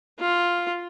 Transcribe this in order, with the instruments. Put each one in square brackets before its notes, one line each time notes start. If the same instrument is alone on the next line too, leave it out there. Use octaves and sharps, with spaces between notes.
[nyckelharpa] F4